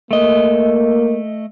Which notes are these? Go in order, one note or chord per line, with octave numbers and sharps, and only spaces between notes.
A3 A#3 D#5